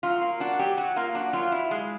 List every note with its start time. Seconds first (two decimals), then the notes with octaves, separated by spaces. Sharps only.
0.03 F#3 F4
0.22 A#3
0.40 D4 F#4
0.59 F#3 G4
0.77 F#3 F#4
0.96 A#3 F4
1.15 D4 F#4
1.33 F#3 F4
1.52 E4
1.71 G#3